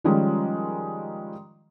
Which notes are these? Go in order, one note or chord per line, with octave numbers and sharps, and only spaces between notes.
D#3 F3 G3 G#3 C#4